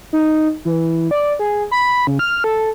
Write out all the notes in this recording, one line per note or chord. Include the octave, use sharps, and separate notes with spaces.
D#4
E3
D5
G#4
B5
C#3
F6
A4